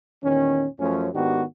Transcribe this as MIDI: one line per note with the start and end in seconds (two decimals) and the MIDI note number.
0.23 0.66 40
0.23 0.66 46
0.23 0.66 51
0.23 0.66 61
0.79 1.09 42
0.79 1.09 53
0.79 1.09 57
0.79 1.09 61
1.14 1.42 44
1.14 1.42 51
1.14 1.42 59
1.14 1.42 62
1.14 1.42 66
1.14 1.42 67